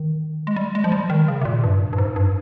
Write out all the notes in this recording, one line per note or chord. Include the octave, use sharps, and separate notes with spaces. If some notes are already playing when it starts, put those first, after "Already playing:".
Already playing: D#3
G#3
G3
G#3
F3
G3
D#3
C#3
C3
A#2
G2
G2
G#2
G2